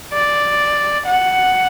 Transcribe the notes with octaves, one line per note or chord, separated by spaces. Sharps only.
D5
F#5